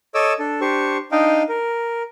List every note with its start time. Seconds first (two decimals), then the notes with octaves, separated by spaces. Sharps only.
0.15 A4 C#5 D#5 D6 E6
0.39 D4 A4
0.61 D4 G4 C5 C#6
1.12 D4 D#4 D#5 F5 G5
1.49 A#4